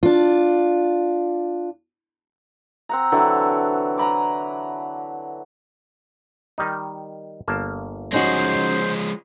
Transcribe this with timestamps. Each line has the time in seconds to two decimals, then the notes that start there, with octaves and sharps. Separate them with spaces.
0.03 D4 F4
2.89 C4 F#5 A#5
3.12 D3 E3 F#3 A4
3.98 G#5 A#5 B5 D6
6.58 D#3 G3 D#4
7.48 G1 A#3 A5
8.13 F3 G#3 C#4 D#4 F#4 C5